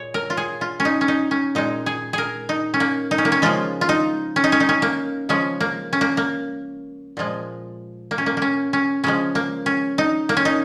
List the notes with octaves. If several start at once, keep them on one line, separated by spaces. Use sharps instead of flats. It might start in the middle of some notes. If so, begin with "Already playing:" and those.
Already playing: A#2 G#3 C#5
A#4
F4
G#4
F4
C#4
D#4
C#4
D#4
C#4
A#2 G#3 D#4
G#4
G#4 A#4
D#4
C#4
A#3
D#4
C#4
A#3
C#4
C#3 F3 G#3 F4
F4
D#4
C#4
D#4
C#4
D#4
C#4
A#3
C#3 F3 G#3 C#4
A#3
C#4
A#3
A#3
A#2 F3 G#3
A#3
C#4
A#3
A#3 C#4
C#4
C#3 F3 G#3 C#4
A#3
C#4
D#4
A#3
C#4
D#4